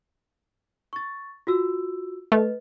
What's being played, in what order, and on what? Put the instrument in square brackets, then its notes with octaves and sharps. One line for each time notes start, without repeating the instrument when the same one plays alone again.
[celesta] C#6 A6
F4 F#4 E6
[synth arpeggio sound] A3 [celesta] B4 D#5